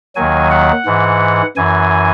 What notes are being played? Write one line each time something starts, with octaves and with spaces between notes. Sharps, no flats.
D#2 D#3 F#3 G#5
F#5
G#2 E3
F#2 E3 G#5